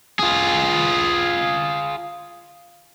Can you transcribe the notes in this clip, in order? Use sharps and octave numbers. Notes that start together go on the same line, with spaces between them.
F4 G#4